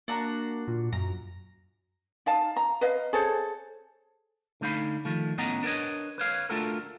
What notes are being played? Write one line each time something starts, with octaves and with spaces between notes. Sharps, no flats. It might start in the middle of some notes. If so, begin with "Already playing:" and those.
A#3 D4 F#4 A#5
A#2
F#2 A#5
D#4 F5 A5
A#5
B4 D#5 F5
G#4 A4 C5 C#5
D3 A3 D#4 F5 B5
D#3 F3 A3
A2 B3 C#4 D#5 F#5 A#5
D4 A#4 B4 C#5 D#5
B4 C#5 F5
A3 D4 F4 F#4 A4 A#4